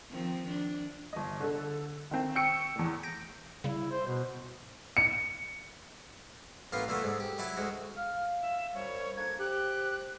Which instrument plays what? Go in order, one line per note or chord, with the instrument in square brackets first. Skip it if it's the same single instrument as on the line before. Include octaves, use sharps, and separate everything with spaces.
[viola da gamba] D#3 F3 C4
D4
[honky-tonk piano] G1 D#5
D3 A4
D#3 C4
G5 C#6 E6 C#7 D7
E2 A2
[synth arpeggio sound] G6 A#6 D7
[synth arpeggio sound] C#3 G3 [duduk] E4
[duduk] C5
B2
[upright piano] C#7
[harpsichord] A1 A#3 B3 F4
A#2 D3 E3 A3 B3
G#2 D3
G4
F#3 E4 D5
D2 G#3 F#4
[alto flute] F5 [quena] F6
[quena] E5
[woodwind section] F#2 G3 [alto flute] C5 [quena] C#5
[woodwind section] D3 A#3 D4 [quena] G#6
[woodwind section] G4 [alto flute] C5 [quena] F#6